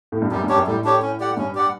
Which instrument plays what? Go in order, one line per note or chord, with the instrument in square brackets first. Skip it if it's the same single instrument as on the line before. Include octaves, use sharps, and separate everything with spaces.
[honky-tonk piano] A2
G2
[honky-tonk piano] F#2 [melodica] G3
[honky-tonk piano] G2
[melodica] D4 G4 C#5
[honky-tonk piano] F#2
[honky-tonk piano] A2 [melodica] G3
[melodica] D4 G4 C#5
C#4
G4 D5 F#5
[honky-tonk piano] G2 [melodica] C#4
[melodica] G4 D5 F#5